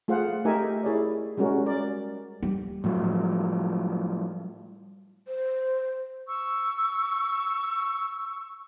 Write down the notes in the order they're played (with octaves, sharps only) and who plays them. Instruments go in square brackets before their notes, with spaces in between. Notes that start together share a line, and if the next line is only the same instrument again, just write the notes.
[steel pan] A3 F4 G#4 C5 F5 F#5
A3 D#4 G4 A#4 E5 G#5
E4 G#4 C#5 D5
G3 G#3 C#4 F#4 A#4
A#4 D5
[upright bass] G3
[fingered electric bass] A2 F3 F#3
[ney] C5
[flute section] C#6 E6